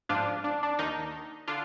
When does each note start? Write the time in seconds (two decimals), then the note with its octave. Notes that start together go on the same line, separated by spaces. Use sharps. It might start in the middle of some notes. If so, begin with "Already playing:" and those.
0.09 G#2 F3 D4 F4
0.44 D4
0.63 D4
0.79 D#2 D#3 D#4
1.48 D3 D4 F4